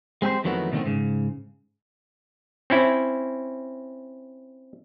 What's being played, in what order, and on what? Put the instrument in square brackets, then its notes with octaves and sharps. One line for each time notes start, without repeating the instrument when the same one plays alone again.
[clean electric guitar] G#3 C4 G4 G#4 C5
F2 D#3 E3 F#3 A3 B3
B2 D3 D#3 F#3 A3 C4
G#2 C#3
[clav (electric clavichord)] C4 C#4 E4